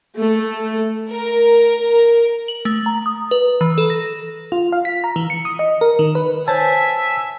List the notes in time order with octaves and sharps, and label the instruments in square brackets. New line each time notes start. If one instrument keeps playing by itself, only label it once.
[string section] A3
A#4
[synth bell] F#7
A3
A#5
D#6
B4
E3
A4
A#6
[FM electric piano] F4
F5
B6
A#5
E3
C#7
D#6
D#5
A#4
D#3
B4
[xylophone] C5 C#5 [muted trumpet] E5 [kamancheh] G#5 [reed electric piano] A5